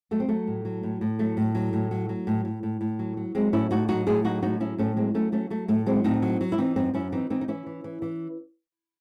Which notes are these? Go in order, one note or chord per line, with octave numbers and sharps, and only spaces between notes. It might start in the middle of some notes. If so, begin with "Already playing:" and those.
F#3 A3
C4
F#3 A3
A2
F#3
A2
A2
F#3 A3
A2
F#3
A2
F#3
F#3
A2
A2
A2
A2
F#3
F#3
F#3 G#3 C4
A2 C#4 E4
A2 D#4 F#4
F#3 D#4 F#4
A2 E4 G#4
F#3 D#4 F#4
A2 D#4 F#4
F#3 C#4 E4
A2 A3 C#4
F#3 G#3 C4
F#3 A3 C#4
F#3 A3 C#4
F#3 A3
A2 A3
F#3 G#3 C4
A2 C4 D#4
F#3
F#3
E4
E3 C4 D#4
F#2 C4 D#4
F#2 C#4 E4
E3 C4 D#4
E3 C4 D#4
D#4
E3 C#4 E4
E3
E3
E3